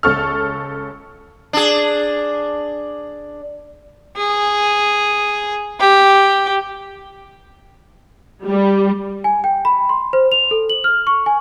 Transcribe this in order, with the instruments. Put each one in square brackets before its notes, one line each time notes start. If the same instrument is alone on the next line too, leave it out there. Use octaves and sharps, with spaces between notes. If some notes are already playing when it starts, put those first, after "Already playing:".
[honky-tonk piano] C#2 C#4 A4 C#6 F6
[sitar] D4 G#4
[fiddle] G#4
G4
[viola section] G3
[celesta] G#5
G5
B5
C6
C5
F7
A4
F#7
F6
C#6
G#5